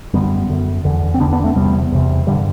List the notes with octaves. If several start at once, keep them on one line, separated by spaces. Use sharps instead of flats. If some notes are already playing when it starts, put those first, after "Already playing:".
F#2 D3 G3 B3
F#2 D3
E2 D3
C4
E2 D3 B3 D4
B3 D4
A3 C4
E2 C3 G3 B3
E2 C3
G2 D3 E3 G3